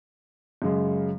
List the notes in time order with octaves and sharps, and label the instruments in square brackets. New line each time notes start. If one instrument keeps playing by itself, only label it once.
[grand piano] F#2 C#3 G#3